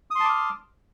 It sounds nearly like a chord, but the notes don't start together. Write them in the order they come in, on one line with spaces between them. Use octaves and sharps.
D#6 C6 A5 D6 F6